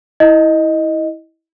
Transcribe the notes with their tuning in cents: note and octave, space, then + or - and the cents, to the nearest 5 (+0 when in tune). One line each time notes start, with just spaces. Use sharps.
E4 -20 D#5 +0